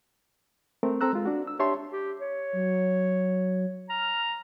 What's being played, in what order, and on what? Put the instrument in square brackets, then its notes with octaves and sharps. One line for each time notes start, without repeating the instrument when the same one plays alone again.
[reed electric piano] A3 C4 A#4
C4 A4 A#5 E6 F#6
G#3 F4
D4 F#4
E6
D4 G4 C#5 E5 A5 C6
[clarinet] G4
C#5
[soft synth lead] F#3
[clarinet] A#5 [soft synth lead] F6